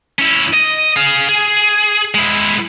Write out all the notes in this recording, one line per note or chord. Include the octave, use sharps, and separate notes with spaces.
C#4 E4
D#5
G#4 F5
G#4
G#3 E4